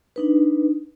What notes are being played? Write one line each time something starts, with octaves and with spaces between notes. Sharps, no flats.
D4 D#4 B4